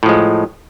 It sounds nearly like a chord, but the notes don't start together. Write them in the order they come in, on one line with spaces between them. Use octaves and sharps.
A2 F3 G#3